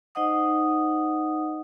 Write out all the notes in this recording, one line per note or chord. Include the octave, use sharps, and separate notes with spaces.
D#4 C5 D#5 F#5 D#6